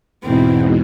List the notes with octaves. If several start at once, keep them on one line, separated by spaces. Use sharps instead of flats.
E2 G#2 B2 C4 E4